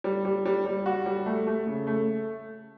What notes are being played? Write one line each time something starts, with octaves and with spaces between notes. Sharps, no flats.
G3
G3
G3
G3
F#4
G3
A3
A3
C#3
A3